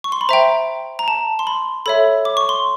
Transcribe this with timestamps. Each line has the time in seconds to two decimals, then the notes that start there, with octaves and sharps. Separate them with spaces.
0.04 C#6
0.12 C6
0.21 B5
0.29 C5 E5 G5 A#5
0.99 A#5
1.08 A5
1.39 C6
1.47 B5
1.86 A4 C#5 E5 B5
2.25 D6
2.37 C#6
2.49 C6